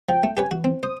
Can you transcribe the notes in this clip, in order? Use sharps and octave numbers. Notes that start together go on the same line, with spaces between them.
F3 G5
A3
G4 B4 C#5 G#5
E3 F#4
C4
C5 D#6